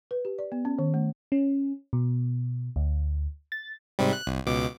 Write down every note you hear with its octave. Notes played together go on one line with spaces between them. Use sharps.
B4
G4
D5
B3
C#4
D#3
A3
C#4
B2
D2
A6
G#2 C3 G3
F#6
C2
C#2 B2 D6